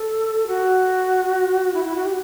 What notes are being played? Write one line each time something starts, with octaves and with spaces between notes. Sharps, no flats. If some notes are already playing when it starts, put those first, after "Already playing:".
Already playing: A4
F#4
E4
E4
F#4
G4